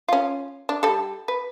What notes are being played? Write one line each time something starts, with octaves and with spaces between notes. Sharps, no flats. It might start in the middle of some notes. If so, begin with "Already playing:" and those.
C#4 F4
D4
G3 A4
B4